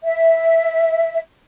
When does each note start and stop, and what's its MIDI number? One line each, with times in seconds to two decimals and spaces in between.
0.04 1.20 76